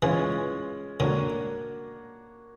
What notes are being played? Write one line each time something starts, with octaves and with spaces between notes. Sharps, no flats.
E3 G#3 C#4 F4
D3 A#3 D4 F#4 A#4 C#5